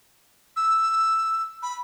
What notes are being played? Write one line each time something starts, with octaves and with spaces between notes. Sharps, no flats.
E6
B5